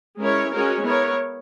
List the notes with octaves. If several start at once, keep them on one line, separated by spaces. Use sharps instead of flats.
G#3 C#4 E4 A#4 C#5
G#3 C#4 F#4 A#4 C#5
B3 E4 A#4 C#5